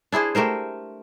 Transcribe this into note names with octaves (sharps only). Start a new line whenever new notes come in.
D4 E4 G#4 C5
A3 G4 A#4 C5